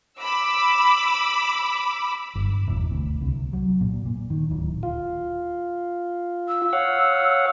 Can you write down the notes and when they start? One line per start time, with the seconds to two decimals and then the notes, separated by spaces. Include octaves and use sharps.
0.20 B5 D6 E6
2.35 G1
2.67 E1
2.91 D2
3.21 C2
3.53 F#3
3.81 A#2
4.06 A#2
4.30 D#3
4.51 D1
4.83 F4
6.47 E6
6.73 C#5 F5 F#5